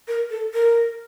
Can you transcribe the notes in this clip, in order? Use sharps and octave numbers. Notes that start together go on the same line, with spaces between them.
A#4
A4
A#4